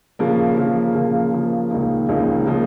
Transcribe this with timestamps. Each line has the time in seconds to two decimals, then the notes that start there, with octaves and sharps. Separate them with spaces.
0.19 C#3 F3 A#3
0.57 C#3 F3 A#3
0.95 C#3 F3 A#3
1.33 C#3 F3 A#3
1.71 C#2 C#3 F3 A#3 D#4
2.09 C#2 C#3 F3 A#3 D#4
2.47 C#3 F3 A#3 D#4